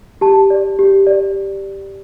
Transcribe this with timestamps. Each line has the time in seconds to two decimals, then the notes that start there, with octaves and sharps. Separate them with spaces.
0.21 G4 A5
0.50 D5
0.79 G4
1.07 D5